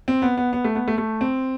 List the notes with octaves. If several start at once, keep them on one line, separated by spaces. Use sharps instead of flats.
C4
B3
B3
B3
A3
B3
A3
A3
C4